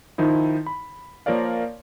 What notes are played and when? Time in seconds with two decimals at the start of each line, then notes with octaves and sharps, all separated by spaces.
0.18 D#3 F3 D#4 E4
0.66 B5
1.26 F3 A#3 A#4 C#5 D5 F5